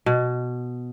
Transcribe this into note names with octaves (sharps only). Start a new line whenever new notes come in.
B2